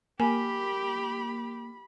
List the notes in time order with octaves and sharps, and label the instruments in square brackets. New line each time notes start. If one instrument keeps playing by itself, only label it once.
[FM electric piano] A#3 [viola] G4 [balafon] G#5 [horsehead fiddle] B5